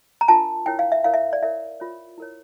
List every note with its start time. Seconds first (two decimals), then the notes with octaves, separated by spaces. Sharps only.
0.21 A#5
0.28 D4 F4 A#4 A5
0.66 E4 A#4 C#5 G5
0.79 F5
0.92 E5
1.04 E4 A#4 C#5 F5
1.14 E5
1.33 D5
1.42 E4 A#4 C#5 E5
1.80 F4 A#4 C#5
2.18 E4 A#4 C#5